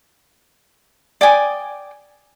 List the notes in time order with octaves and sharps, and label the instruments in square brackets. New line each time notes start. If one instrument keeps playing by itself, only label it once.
[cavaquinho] D5 G5 G#5 D#6